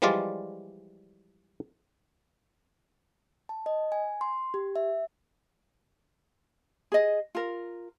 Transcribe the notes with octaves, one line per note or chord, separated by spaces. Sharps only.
E3 F3 G3 G#3 F4 D5
A5
D#5
G#5
C6
G4
E5
G#4 D#5
F4 A#4